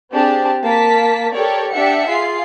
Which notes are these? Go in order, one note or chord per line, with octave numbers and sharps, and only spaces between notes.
C4 D4 G4 G#4 A5
A#3 A5 B6
G4 A4 A#4 C#5 D5
D4 G4 E5 F#5 C#7
F4 G#4 C7